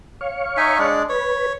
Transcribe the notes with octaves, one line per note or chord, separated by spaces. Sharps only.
C#5 F5 C#6
D#4 E5 G#5
G#3 D4
B4 C#5